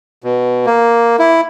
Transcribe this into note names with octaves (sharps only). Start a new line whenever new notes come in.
B2
A#3
E4